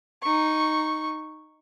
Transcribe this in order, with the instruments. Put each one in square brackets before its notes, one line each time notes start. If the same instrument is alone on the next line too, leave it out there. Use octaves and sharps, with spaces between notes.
[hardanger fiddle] D#4 C#6